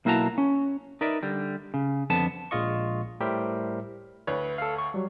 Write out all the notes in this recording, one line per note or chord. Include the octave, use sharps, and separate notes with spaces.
B1 A#3 E4 F#4 A5 A#5
C#4
D#4 A#4 B4 D5 E5
D3 G3
C#3
F2 D3 B3 A5
A#1 A#2 G#3 F4 D#5 C#6
A2 G3 G4 A#4 C5 E5
D2 B4 C#5
A4 F5
C#6
F#3 G3